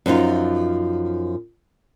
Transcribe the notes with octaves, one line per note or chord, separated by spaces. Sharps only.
F#2 F3 D#4 F4